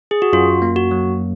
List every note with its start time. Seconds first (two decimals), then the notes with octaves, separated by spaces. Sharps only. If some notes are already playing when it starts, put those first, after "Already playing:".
0.11 G#4
0.22 F#4
0.33 F#2 F4
0.62 A#3
0.76 F#4
0.91 F#3